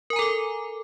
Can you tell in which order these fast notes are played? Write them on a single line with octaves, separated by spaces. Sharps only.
A#4 G#5 A#5 A4 D6